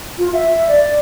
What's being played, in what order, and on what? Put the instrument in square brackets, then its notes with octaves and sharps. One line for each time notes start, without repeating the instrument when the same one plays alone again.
[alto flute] F4
E5
D5